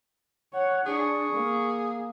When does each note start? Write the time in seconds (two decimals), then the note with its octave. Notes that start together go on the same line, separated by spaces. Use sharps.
0.53 C#5 F#5
0.86 D4 G#4 C#6
1.32 A#3